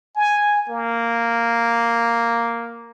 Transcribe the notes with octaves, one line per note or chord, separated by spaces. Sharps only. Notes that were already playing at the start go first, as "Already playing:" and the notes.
G#5
A#3